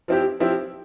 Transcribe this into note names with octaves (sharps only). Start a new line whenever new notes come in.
F3 C4 E4 G4
F3 C4 E4 G4